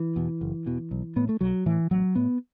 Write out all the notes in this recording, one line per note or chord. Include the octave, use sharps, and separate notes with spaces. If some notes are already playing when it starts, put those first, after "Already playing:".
Already playing: E3
E2 B2
F#1
E2 B2
B1
A2 B3
A3
B1 F#3
A2 E3
A1 F#3
A2 B3